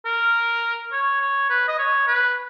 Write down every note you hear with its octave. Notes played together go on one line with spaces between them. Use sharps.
A#4
C#5
C#5
B4
D#5
C#5
B4